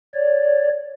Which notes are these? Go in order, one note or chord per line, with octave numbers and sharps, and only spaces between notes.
C#5 D5